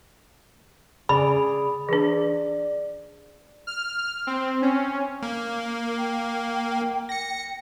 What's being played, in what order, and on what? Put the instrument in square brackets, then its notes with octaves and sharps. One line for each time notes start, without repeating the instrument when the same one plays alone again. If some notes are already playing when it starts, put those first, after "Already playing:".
[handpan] C#3 G#4 D5 [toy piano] B5
[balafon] E3 D4 [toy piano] G#4 B4 [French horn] D5
[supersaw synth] F6
C4
C#4
[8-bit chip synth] A#3
[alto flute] G5
[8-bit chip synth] A#6 C#7